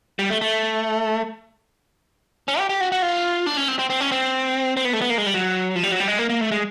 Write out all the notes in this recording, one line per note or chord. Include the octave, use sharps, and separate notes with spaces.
G3
A3
A3
C#4
G4
G4
F#4
F#4
F4
D4
C#4
C4
C4
C4
C#4
C4
C4
B3
A3
B3
A#3
G#3
G3
F#3
F3
G3
F#3
G3
G#3
A#3
A#3
A3
G#3